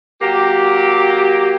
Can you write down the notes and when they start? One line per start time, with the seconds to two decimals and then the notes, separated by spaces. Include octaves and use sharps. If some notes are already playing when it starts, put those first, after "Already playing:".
0.21 F#3 A#3 G4